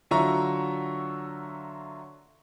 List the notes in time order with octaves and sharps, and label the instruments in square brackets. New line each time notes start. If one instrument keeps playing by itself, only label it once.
[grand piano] D3 F#3 F4 E5 A#5 C#6